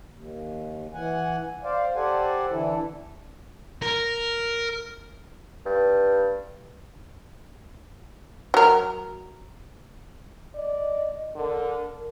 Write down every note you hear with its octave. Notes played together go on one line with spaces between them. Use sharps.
D#2
E3 F#5 G#5
C5 D5 F5
G4 A4 C5 D5 F#5 G#5
D3 E3 E4 A4
A#4
G2
F#3 A#4
D5 D#5
D3 A#4